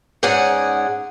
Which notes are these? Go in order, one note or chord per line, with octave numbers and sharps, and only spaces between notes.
G#2 C#4 G#4 D5 F#5 G#5